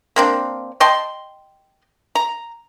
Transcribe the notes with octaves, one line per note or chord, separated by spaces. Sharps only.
A#3 C4 D4
D#5 G5 A5 C6
A#5